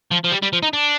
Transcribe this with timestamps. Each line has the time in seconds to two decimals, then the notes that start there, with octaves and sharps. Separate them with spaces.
0.11 F3
0.24 F3
0.32 G3
0.43 G3
0.53 F3
0.63 D#4
0.73 D4